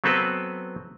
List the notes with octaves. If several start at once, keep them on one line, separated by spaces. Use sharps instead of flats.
F#3 B3 C4 A4 B4